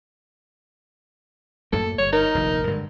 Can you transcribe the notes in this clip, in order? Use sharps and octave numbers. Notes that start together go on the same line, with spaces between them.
F#2 A2 A#3 A4
G1 G3 C#5
D#4 A#4
F1 A#1 D#2
G2 D3 G#3